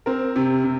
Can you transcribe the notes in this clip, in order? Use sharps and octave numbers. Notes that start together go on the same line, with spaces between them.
C4 A#4
C3
C3